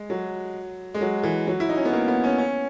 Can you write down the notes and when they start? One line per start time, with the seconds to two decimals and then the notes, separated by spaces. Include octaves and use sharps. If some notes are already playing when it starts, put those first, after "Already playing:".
Already playing: G#3
0.10 F#3
0.94 G#3
1.01 F#3
1.23 E3
1.47 F#3
1.60 E4
1.69 D#4
1.77 C#4
1.85 B3
1.93 A#3
2.08 B3
2.24 C#4
2.38 C#4